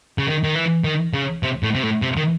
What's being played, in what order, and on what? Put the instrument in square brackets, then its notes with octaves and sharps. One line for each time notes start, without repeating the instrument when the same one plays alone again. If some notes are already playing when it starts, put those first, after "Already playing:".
[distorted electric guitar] C#3
D#3
D#3
E3
D#3
C#3
C3
A2
C3
A2
C3
D#3